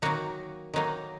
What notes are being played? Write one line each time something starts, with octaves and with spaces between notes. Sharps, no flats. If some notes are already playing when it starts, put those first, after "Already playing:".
D#3 F#3 A#3 D#4 F#4
D#3 F#3 A#3 D#4